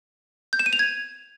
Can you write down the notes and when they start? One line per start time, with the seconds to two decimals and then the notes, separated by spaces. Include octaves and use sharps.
0.53 G6
0.59 E7
0.66 D#7
0.73 F7
0.79 G#6